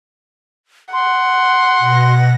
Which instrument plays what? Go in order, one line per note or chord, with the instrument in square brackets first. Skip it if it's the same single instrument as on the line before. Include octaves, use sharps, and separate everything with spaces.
[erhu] F#5 [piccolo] C6
[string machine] B2 A#6